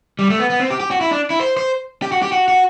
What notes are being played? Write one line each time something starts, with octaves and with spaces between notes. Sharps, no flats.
G3
A3
B3
B3
C4
G4
G4
F#4
E4
D4
E4
C5
C5
G4
F#4
G4
F#4
F#4